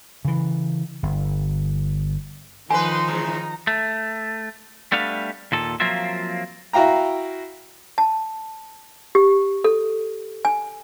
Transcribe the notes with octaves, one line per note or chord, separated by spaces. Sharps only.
C#3 E3
G1
D#3 F3 A3 D#4 B4 G#5 C6
C#3 E3 G#3 A#5
A3
G3 A3 B3 D4 F5
D#2 A#2 A4
F3 F#3 A#3 C4 F4 E5
E4 F#4 F5 G5 A#5
A5
G4
A4
G#5